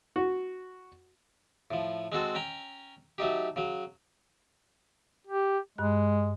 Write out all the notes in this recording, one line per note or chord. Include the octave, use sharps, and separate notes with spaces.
F#4
A2 F3
G#3 C4 F#4 A4
C#4 G5 A#5
F#3 A3 D#4 G4
C#3 F#3
G4
G2 G#3 F#6